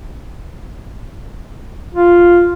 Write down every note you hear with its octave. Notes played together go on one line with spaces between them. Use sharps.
F4